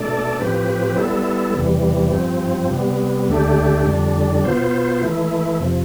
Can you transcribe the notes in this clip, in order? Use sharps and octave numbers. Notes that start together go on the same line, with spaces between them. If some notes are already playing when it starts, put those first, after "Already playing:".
Already playing: B2 A3 D4 A4 D5
A2 F3 C4 G4 B4
G3 B3 E4 A4
E2 C3 E3 G3
G2 F3 C4
C3 G3 B3
D2 D3 A3 D4 G4
F2 D3 G3 D4
B2 B3 F4 C5
E3 A3 E4
F2 C3 F3